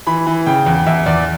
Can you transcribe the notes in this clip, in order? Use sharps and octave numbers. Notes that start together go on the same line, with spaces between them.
E3 B5
E3
C#3 G5
E2
E2 E5
E2 D5